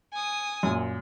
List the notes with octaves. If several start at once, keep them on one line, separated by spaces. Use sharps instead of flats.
G#5 D#6
F#2 A#2